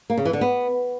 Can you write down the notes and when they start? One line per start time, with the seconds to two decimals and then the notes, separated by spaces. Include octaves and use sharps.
0.10 A#3
0.18 C#3
0.25 E3
0.33 D3
0.41 B3